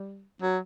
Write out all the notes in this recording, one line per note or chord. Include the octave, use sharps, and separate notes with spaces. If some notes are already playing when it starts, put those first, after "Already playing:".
Already playing: G3
F#3